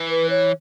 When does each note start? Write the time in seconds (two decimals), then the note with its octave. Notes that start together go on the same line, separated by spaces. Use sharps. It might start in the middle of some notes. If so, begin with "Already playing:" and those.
Already playing: E3
0.09 B4
0.30 C#5